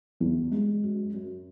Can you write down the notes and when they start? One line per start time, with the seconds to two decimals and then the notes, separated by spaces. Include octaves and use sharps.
0.20 E2
0.52 G#3
0.83 F#2
1.14 F#2